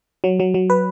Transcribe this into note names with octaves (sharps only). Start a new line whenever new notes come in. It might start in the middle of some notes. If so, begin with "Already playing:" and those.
F#3
F#3
F#3
B4